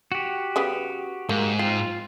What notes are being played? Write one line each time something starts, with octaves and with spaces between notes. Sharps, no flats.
F#4 G4
C#3 G3 B3
G#2 A#3
C4 F4